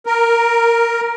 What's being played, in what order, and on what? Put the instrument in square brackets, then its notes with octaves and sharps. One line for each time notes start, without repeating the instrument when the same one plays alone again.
[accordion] A#4